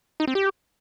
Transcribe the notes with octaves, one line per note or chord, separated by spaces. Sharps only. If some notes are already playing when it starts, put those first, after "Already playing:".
D#4
C4
G4